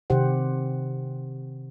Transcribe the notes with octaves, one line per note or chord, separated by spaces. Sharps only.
C3 D#3 G4 C5 F#5